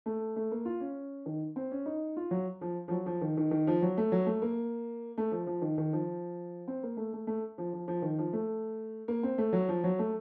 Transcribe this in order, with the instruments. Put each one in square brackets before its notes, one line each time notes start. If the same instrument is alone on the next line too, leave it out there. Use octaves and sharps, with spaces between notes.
[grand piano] A3
A3
A#3
F4
C#4
D#3
C4
C#4
D#4
F4
F#3
F3
F3
F#3
F3
D#3
D#3
D#3
F3
F#3
A3
F#3
A3
A#3
A3
F3
F3
D#3
D#3
F3
C4
A#3
A3
A3
A3
F3
F3
F3
D#3
F3
A3
A#3
C4
A3
F#3
F3
F#3
A3